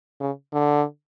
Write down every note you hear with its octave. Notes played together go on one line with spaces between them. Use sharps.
C#3
D3